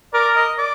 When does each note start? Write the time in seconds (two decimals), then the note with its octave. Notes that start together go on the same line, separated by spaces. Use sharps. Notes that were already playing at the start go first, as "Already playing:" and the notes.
0.14 A#4 D5
0.36 D#5
0.59 D5